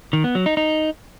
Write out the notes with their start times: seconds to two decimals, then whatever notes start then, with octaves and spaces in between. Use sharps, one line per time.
0.13 D#3
0.24 B3
0.35 F#3
0.46 D#4
0.57 D#4